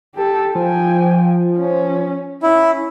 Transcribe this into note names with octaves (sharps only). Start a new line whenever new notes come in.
G4 A4
F3 G5 G#5
C#4
C#4 E4